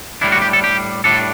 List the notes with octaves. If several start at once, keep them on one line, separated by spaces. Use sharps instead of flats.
A2 G3 D4 E4
F#4
G4
A4
G4
A2 G3 D4 A4